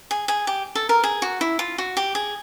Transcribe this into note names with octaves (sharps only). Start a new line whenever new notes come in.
G#4
G#4
G4
A4
A#4
G#4
F#4
E4
F4
F#4
G4
G#4